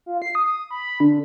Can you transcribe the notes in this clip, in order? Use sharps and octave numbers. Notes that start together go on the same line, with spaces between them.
F4
C7
D#6
B5
D3